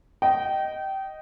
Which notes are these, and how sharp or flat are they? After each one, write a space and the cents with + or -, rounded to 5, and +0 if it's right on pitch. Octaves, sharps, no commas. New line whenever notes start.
D#5 +0 G5 -25